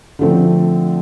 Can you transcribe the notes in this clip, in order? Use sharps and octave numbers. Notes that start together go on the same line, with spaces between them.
D3 F3 A3 C4